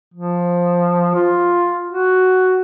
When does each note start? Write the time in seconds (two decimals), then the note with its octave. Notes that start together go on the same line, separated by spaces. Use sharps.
0.14 F3
1.14 F4
1.89 F#4